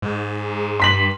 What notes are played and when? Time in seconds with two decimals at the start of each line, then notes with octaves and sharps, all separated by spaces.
0.02 G#2
0.80 G2 C6 B6 F#7